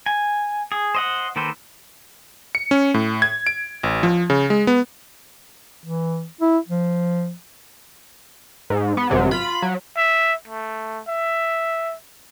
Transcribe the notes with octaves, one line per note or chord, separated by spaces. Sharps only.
G#5
G#4
C5 D#5 F#5
D#3 A#3 A4 B4 C5
C#7
C#4
A2
G#6
D7
A1
F3
C#3
G#3
B3
E3
E4
F3
G#2
B3
G#1 F#2 C3 F#3
F4 B5
F#3
E5
A3
E5